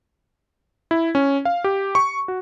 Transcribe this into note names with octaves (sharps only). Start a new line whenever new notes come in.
E4
C#4
F5
G4
C#6
F#4